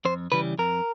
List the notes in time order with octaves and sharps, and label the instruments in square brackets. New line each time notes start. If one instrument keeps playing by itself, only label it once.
[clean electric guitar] F2 C5
C#3 E3 G3 B4
F2 A#4